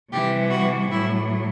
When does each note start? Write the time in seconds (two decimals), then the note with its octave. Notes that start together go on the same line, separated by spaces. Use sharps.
0.11 C3 E3 G3 G4
0.51 F#4
0.91 A2 F#3 E4